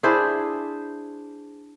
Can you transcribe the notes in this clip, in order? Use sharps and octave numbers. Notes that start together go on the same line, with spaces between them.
D4 E4 G#4 C5